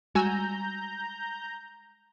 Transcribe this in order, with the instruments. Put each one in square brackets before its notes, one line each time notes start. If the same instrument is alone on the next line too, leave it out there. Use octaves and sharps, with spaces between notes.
[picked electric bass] G3 G#3 [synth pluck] F#4 G#5 E6 [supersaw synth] A#5 G6